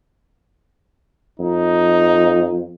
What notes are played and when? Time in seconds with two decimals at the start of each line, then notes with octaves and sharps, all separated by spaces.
1.40 F2 D#4